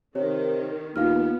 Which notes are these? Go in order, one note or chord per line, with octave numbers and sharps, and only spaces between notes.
C3 D#3 C#5
D#2 B3 F4 F5 F6